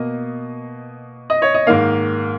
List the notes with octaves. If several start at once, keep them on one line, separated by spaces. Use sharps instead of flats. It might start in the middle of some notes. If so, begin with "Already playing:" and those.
Already playing: B2 A#3 D#5
D#5
C#5
D#5
G#2 D#3 A#3 F5